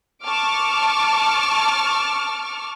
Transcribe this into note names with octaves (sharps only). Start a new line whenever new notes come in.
A5 C#6 D6 F6